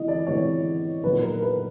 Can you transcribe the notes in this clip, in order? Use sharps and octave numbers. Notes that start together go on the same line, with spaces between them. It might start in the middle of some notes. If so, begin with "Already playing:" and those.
Already playing: C3 E3 G#3 B3 D#5
D5
C3 E3 G#3 B3 C#5
A#2 F#3 B3 D#4 B4
A#4
B4